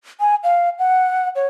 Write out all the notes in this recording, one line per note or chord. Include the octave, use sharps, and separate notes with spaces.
G#5
F5
F#5
C#5